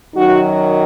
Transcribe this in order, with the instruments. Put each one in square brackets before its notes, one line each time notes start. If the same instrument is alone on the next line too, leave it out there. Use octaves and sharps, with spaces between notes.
[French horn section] F#2 D#3 F#3 D#4 F#4